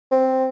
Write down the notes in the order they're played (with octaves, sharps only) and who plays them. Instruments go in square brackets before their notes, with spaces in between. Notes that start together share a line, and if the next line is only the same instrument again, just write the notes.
[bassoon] C4